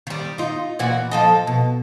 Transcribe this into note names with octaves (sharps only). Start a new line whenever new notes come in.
D#3 G3
D#4 F4
A#2 E3 F#4
F3 A4 D#5
B2